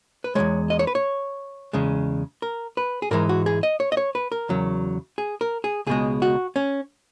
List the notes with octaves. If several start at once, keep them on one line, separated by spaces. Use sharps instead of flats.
B4
E2 C#3 G#3 C#5
D#5
C#5
B4
C#5
E2 C#3 G#3
A#4
B4
G#4
G#2 E3 G#3 A#4
F#4
G#4
D#5
C#5
D#5
C#5
B4
A#4
E2 C#3 F#3
G#4
A#4
G#4
C#2 B2 G#3 G#4
F#4
C#4